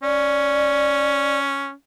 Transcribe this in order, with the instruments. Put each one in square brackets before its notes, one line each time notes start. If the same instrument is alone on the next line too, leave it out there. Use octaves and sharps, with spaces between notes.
[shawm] C#4 [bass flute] D5